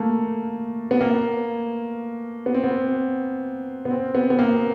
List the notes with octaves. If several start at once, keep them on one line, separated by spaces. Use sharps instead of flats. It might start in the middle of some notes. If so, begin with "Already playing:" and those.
Already playing: A3 A#3
B3
A#3
B3
C4
B3
B3
C4
B3
B3
A#3